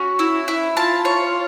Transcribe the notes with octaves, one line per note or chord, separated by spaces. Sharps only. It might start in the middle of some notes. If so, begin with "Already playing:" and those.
Already playing: C#4 F#4
E4
E4
F4 A5
C#5